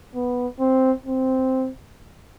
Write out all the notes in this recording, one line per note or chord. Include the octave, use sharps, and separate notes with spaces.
B3
C4
C4